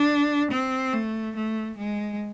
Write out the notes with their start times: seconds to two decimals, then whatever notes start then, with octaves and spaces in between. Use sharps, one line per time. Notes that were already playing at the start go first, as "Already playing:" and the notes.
Already playing: D4
0.51 C4
0.93 A3
1.36 A3
1.78 G#3